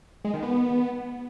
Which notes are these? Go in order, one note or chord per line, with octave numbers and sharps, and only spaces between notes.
G#3
D#3
B3